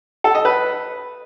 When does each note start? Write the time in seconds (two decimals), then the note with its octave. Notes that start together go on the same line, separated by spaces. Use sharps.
0.24 A4
0.35 D#5
0.45 B4